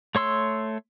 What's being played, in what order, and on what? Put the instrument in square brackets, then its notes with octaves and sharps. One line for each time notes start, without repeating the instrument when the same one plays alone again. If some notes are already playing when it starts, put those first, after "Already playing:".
[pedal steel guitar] A3 C#5 C6 E6